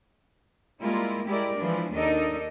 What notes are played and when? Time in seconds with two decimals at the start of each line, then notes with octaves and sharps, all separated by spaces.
0.82 G3 G#3 A#3 E4 F4 A#4
1.26 G#3 E4 G4 A#4 D5
1.58 E3 F3 G#3 D4
1.94 D#2 D4 D#4 A4 A#4 D#5